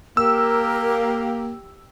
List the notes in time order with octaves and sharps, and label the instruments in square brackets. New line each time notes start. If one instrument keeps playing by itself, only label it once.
[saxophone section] A#3 [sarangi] G4 [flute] A#4 [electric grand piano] E6